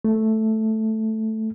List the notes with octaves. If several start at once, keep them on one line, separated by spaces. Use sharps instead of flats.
A3